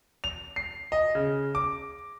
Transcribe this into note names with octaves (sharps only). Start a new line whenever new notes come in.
F7
C7
D#5
C#3
D6